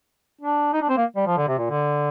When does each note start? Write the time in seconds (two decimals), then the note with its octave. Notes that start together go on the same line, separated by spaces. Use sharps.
0.41 D4
0.73 D#4
0.82 D4
0.89 C4
0.97 A#3
1.16 G3
1.27 F3
1.38 D3
1.48 C3
1.58 A#2
1.70 D3